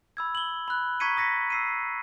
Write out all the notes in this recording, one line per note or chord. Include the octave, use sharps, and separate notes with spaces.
B5 E6 G#6
F#7 G7
B5 F#6
A#5 C#6 G#6 B6 C#7 D#7
D#6 A#6 B6 C#7
E6 C7 D#7